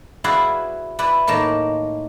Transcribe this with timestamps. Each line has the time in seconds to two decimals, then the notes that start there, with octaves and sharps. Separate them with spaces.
0.24 E4 F#4 G#4 B4 D5 F5
0.99 E4 B4 D5 E5
1.27 A2 D#3 A#3 A5